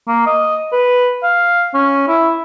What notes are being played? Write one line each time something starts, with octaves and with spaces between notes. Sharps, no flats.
A#3
D#5
B4
F5
C#4
E4